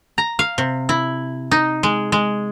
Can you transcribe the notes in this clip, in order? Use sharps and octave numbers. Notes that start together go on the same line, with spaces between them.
A#5
F5
C3
E4
D#4
G#3
G#3